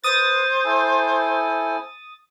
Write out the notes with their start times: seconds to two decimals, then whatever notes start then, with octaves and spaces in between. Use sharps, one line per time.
0.04 B4 C5 D#6 A6
0.64 E4 A4 G#5